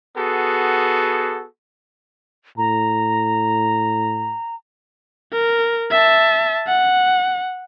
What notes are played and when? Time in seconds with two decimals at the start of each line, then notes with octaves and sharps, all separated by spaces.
0.17 B3 F#4 G#4 A4
2.58 A2 A#5
5.33 A#4
5.91 E5 A5
6.68 F#5